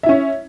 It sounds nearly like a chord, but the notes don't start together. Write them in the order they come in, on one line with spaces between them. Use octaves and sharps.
E5 E4 C#4